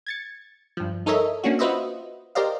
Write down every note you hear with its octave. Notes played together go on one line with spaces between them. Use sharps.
G#6 A6 C#7
G2 F3
D#4 A4 A#4 C#5 D#5 E5
A#3 C#4 D4 F#4
F4 F#4 B4 C5 D#5 E5
G4 A#4 C5 D5 D#5 F5